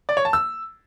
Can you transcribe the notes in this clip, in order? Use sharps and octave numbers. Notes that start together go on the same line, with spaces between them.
D5
C#5
A5
E6